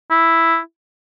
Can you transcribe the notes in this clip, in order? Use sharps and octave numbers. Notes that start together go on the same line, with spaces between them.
E4